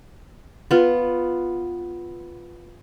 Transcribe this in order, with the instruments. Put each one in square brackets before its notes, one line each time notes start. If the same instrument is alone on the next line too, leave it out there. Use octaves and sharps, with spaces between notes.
[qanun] B3 F4